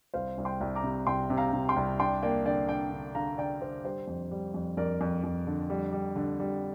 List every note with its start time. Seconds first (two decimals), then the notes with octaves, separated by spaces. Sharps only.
0.14 C2 C5 F5
0.38 C2
0.45 G5 C6
0.61 C2
0.75 A#5 D6
0.83 C3
1.07 C2 G5 C6
1.30 C3
1.37 F5 A#5
1.53 C3
1.69 G5 C6
1.76 C2
1.99 D4 G5 C6
2.23 A#3 D5 G5
2.45 D3 D5 G5
2.68 D3 D5 G5
2.92 D3
3.15 D3 F5 A#5
3.38 D3 D5 G5
3.61 D3 C5
3.84 G3 C5
4.08 F2
4.31 G3
4.54 F2
4.77 F2 A#4 D5
5.01 F2
5.24 F2
5.47 D3
5.70 G3
5.92 G3
6.16 D3
6.40 G3